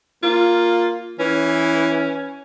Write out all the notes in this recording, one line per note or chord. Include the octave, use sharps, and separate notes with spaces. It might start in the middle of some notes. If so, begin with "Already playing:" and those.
A#3 F4
E3 C#4